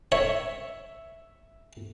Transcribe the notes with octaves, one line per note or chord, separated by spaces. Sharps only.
C#5 E5